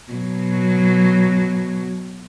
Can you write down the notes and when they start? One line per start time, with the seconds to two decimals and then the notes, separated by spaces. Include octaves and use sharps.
0.12 B2 F#3